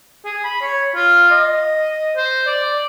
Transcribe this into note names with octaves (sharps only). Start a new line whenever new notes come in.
G#4
B5
C#5
F4
D#5
C5
D5